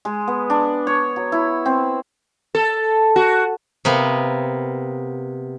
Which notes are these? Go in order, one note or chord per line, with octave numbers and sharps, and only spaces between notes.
G#3
B3
D4
C#5
F#3
E4
C4
A4
F#4
C3 A#3 B3